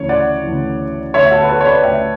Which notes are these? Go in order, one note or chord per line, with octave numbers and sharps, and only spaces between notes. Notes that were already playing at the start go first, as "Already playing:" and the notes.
Already playing: D2 C#3 E3 C#5
D5 F#5
D2 C#3 E3
D2 D3 C#5 E5
F#4 A4
B4
A4 C#5
C#5
B4 D5
D2 D3 E5 G5